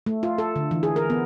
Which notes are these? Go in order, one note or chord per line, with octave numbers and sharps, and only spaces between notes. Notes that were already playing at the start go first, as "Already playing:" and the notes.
A3
F4
A4
D3
E3
G#4
A#4
B3